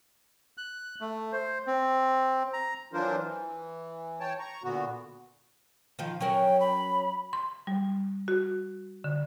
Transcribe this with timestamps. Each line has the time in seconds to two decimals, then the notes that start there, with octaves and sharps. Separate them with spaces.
0.58 F#6
1.01 A3
1.32 C5
1.67 C4
2.53 A#5
2.93 E3 F#3 D4 F4 A#4 C5
3.19 E3
4.20 C#5 G5 A5
4.39 A#5 C#6
4.64 A#2 D3 B3 F#4
5.99 D#3 F3 F4
6.21 F#3 C#4 A#4 G5
6.60 B5
7.33 C6
7.67 G3
8.28 F#4
9.04 D3